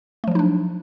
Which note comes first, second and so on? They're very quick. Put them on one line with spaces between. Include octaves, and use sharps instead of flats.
A3 F3 F#3 D#4 D4